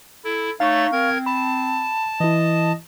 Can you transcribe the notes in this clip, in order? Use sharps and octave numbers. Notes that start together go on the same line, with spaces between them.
E4 A4
A3 D#4 C#5 F5 C#6 A6
C4 A#4 G#6
A5 B5
E3 E4 D#5